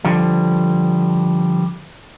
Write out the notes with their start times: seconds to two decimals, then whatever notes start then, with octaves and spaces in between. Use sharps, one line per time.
0.05 D3 F3 G3